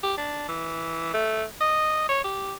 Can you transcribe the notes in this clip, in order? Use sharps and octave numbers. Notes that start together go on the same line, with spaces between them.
G4
D4
E3
A3
D#5
C#5
G4